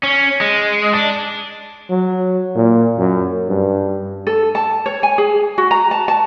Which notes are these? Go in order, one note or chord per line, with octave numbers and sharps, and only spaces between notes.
C#4
G#3
D4
F#3
A#2
F#2
G2
A4
A5
C#5
G#5
G#4
F#4
A#5
A5
A5